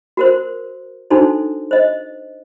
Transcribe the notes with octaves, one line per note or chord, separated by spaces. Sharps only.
F#4 A#4 C5
D4 D#4 F#4 A4 C5
C5 D#5